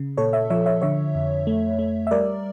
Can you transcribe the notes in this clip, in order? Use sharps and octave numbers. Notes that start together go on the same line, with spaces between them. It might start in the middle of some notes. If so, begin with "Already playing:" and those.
Already playing: C#3
A#2 A4 C#5
C#5 E5
F3 C#5 E5
C#5 E5
D3 C#5 E5
F2
A3
A3
E5
G3 A#4 D5